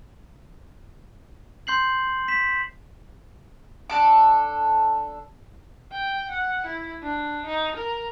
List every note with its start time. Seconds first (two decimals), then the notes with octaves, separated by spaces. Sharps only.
1.67 C6 G6 C7 F#7
2.28 B6 E7
3.90 D4 A4 D6
5.92 G5
6.31 F#5
6.66 E4
7.02 D4
7.46 D#4
7.77 A#4